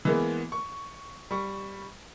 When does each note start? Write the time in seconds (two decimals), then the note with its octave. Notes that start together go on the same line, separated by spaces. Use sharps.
0.05 E3 G#3 A#3 B3
0.52 C#6
1.31 G3 C#6